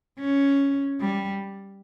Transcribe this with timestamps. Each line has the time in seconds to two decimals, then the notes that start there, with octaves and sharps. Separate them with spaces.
0.19 C#4
1.00 G3